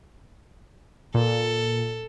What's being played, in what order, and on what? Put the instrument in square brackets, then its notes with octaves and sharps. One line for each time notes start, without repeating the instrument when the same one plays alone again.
[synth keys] A#2 [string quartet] A4